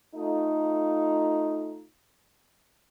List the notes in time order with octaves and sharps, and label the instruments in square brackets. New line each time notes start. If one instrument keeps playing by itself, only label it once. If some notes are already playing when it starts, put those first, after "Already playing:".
[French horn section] A3 D#4 F4